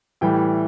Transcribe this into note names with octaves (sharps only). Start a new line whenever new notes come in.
A2 E3 G3 G5